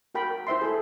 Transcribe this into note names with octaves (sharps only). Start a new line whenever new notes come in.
F#4 A#4 G5 B5
E4 C5 E5 C6
G#4 A4